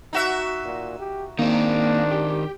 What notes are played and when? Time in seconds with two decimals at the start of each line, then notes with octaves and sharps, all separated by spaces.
0.13 D#4 F#4 E5
0.65 A#2
1.00 G4
1.39 D#3 A#3 C4 D4
2.11 G4